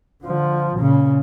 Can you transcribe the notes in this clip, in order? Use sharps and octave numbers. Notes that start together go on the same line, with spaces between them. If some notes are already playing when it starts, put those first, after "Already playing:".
D3 F3
A#2 C#3